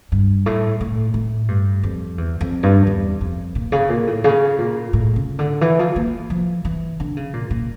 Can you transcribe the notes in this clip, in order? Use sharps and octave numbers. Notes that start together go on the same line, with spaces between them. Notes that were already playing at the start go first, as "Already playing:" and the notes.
G2
A2
A2
A2
G2
F2
E2
F2
G2
E2
F2
A#2
C#3
A#2
A2
C#3
A#2
A2
C#3
D3
E3
F3
A#3
F3
E3
D3
C#3
A#2
A#2